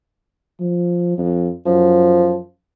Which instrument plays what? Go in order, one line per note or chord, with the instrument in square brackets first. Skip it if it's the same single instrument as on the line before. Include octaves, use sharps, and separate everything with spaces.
[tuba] F3
F2
[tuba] F#2 [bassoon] F3